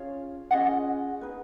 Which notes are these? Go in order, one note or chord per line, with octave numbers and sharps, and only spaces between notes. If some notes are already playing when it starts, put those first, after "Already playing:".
Already playing: C#4 F4 G#4 C#5 F5
C#4 F4 G#4 D#5 F#5
D#4 G#4 B4